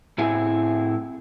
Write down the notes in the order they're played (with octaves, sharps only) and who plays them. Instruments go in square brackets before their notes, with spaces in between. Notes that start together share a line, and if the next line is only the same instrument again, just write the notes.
[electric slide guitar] A2 C4 E4 G#4